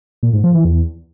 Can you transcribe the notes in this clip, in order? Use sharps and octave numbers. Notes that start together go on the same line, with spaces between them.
A#2
G#2
F3
E3
E2